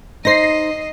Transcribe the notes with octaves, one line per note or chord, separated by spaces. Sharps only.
D#4 C5 D#5 A#6 C7